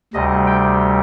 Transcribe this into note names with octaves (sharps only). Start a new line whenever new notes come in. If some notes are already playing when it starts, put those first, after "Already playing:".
D2 C3 G3 D#5
G5